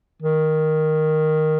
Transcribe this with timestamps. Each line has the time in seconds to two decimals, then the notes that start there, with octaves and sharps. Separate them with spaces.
0.23 D#3